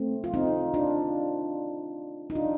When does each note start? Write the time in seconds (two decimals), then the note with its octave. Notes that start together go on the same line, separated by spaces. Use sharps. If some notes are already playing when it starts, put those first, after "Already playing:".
Already playing: A3 C4
0.24 F4
0.34 C4 D#4
0.74 D4 F4
2.30 D#4
2.35 D4 F4